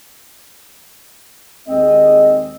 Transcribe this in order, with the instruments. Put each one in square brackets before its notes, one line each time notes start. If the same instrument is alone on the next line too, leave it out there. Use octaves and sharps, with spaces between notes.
[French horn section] D#2 G#3 D#5 [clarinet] C4